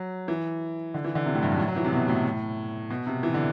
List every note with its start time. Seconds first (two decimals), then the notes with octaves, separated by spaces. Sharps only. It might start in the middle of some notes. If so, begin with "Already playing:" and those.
Already playing: F#3
0.28 E3
0.94 D3
1.04 E3
1.15 D3
1.26 C3
1.35 A2
1.42 G2
1.52 F#2
1.59 A2
1.68 F#3
1.76 E3
1.84 C3
1.93 B2
2.08 A2
2.91 B2
3.07 C3
3.23 E3
3.34 D3